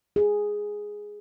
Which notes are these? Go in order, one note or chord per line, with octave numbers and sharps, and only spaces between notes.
G#4